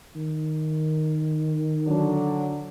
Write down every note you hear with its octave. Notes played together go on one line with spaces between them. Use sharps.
D#3
D3 F#3 D4